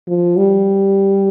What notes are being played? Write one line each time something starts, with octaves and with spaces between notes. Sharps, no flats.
F3
G3